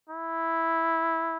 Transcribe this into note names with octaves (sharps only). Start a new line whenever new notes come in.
E4